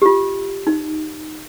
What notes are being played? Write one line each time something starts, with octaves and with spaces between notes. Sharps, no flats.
G4
F4
D#4